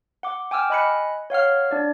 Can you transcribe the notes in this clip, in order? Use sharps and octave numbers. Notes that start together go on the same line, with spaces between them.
F#5 D6
G5 G#5 D6 E6 F6
D#5 G#5 B5 F#6 C#7
C#5 F5 F#5 F6
D4 D5